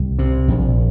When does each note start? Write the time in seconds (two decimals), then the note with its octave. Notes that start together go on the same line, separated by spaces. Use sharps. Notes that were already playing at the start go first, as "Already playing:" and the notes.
Already playing: C2
0.19 C3
0.48 A#1